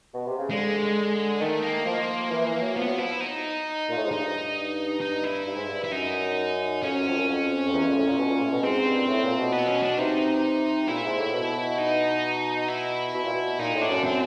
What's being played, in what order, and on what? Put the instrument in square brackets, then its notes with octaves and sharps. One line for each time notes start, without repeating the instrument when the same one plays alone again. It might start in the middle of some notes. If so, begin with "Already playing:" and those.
[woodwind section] B2
C3
C#3
[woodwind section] D3 [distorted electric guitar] G#3
[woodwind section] D#3 [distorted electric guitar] A3
[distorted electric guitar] A#3
[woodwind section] F3
E3
E3
F#3
[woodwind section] F3 [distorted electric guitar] B3
[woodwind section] F#3
[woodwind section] F3 [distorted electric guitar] E4
[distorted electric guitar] D#4
[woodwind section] A#2
A2
G#2
[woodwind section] G2 [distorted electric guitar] D#4
[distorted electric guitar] D#4
E4
[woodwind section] G2
G#2
G2
[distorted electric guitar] E4
[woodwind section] F#2 [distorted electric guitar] D#4
[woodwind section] F2 [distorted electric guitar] C#4
[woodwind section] F#2
F2
F#2
F2
F2
E2
F2
A#2
A2
A#2
B2
A#2
A2
B2
[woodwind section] G#2 [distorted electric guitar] C4
[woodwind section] G2
A#2
A2
A#2
B2
[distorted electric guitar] B3
C#4
D4
[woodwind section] C3 [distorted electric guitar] D#4
[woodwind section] A#2 [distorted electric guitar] E4
[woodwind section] G#2
A2
B2
[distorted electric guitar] D#4
E4
[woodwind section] B2
A#2
B2
[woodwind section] A#2 [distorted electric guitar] D#4
[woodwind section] A2
[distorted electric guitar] D4
[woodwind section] F#2
[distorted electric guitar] C4